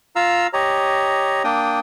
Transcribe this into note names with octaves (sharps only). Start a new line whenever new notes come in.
F4 F5 A#5 E6
G4 C#5 D#5 A#5
A#3 D4 G5 D#6